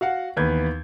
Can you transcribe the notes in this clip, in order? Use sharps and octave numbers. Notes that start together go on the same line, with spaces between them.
F#4 F5 F#5
D#2 E3 B3 B4 G6 G#6